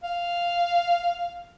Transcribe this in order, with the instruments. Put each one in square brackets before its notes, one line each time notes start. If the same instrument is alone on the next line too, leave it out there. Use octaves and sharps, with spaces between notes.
[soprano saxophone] F5